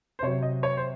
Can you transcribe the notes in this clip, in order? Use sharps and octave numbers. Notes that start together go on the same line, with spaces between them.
C5
C3 F#3 C#5
D#5
C#5
C5